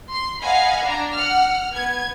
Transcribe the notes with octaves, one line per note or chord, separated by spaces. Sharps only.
C6
D#5 F5 F#5 G#5 B5
D4 A#5
F#5 F6
B3 G#6